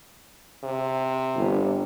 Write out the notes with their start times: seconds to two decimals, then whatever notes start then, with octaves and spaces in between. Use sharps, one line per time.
0.64 C3
1.36 G1